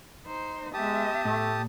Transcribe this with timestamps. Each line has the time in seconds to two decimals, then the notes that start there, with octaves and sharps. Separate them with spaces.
0.25 D#4 C5
0.74 G#3 B3 G4 E5 A5 D#6
1.25 A2 A3